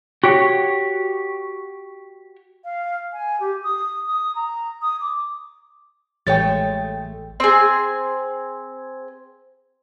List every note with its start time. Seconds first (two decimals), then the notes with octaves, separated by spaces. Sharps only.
0.24 F#4 G4 C#5
2.64 F5
3.13 G#5
3.40 G4
3.63 D#6
4.07 D#6
4.35 A#5
4.82 D#6
5.01 D6
6.27 A1 G#3 A3 C#5 G5 A6
7.40 C4 G#4